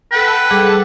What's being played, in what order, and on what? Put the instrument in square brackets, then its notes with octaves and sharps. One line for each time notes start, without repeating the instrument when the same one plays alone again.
[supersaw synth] A4 F#5 G5 [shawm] B4
[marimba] G3 G#4 D6 [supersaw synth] A4 F#5